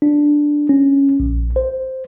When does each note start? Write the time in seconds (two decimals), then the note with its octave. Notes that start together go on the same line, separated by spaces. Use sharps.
0.02 D4
0.69 C#4
1.20 A#1
1.56 C5